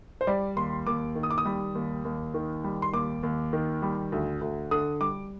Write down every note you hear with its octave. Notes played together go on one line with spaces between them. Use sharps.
C5
G3 D5
D#2 C6
D#2 D6
D#3
D#6
D6
D#6
G3
D#2
D#2
D#3
G3
C6
D#2 D6
D#2
D#3
G3
D2
D2
D3 D#6
G3 D6